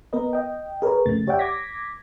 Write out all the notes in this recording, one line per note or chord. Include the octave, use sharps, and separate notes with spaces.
B3 A#4 B4 D#5
D#5 G5
G#4 A#4 B4 C#5
F2 C#3 A3 A6
G4 C#5 D5 E5 F#5 G5
D6 G#6 A#6 B6